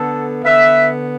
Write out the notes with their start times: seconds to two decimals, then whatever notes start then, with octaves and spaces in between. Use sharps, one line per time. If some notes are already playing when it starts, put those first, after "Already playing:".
Already playing: D3 B3 A4
0.44 D3 B3 B4 E5